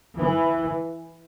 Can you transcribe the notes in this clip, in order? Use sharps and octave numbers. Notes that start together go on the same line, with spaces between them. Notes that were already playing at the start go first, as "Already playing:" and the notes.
E3